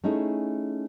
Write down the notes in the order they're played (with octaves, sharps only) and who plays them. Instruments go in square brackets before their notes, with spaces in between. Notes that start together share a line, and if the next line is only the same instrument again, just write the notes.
[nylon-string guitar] A3 C#4 D#4 E4 G#4